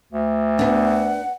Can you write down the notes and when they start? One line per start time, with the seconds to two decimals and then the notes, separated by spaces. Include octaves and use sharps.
0.12 D2
0.59 B3 D4 F#5